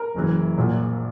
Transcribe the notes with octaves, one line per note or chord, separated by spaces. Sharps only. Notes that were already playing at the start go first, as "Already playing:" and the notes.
Already playing: A#4
F#1 F#2 E3
A#1 A#2 F#3